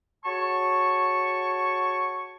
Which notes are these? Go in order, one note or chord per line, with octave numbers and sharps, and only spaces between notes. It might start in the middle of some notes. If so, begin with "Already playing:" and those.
F#4 G#4 C#5 A5 C#6